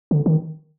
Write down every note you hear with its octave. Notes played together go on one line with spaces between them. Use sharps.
D3
D#3